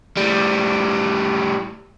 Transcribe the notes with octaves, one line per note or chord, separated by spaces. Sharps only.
A2 G3